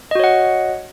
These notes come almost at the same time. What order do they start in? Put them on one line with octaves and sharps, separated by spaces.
D#5 F#4 C#5 F#5